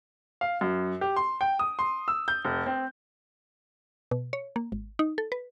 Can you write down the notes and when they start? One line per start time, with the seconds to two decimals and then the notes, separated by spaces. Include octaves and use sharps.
0.41 F5
0.61 F#2
1.01 G4
1.16 C6
1.41 G5
1.59 D#6
1.79 C6
2.08 E6
2.28 G6
2.45 F1
2.66 C4
4.11 B2
4.33 C#5
4.56 A#3
4.72 G#1
4.99 D#4
5.18 A4
5.32 B4